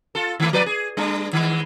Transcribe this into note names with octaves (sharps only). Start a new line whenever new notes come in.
F4 A4
D#3 A3
F3 B4 D5
G#4
G3 D4
D#3 G#3